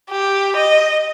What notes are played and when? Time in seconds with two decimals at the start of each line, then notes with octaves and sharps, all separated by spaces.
0.10 G4
0.56 D#5